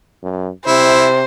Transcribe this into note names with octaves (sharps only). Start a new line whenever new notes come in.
F#2
C3 E4 C5